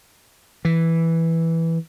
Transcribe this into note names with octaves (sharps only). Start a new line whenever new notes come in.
E3